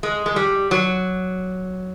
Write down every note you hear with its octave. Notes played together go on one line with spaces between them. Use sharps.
G#3
G#3
G3
F#3